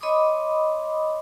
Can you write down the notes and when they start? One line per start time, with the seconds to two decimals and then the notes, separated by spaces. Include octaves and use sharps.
0.01 C#5 D#5 B5 C6 D6 D#6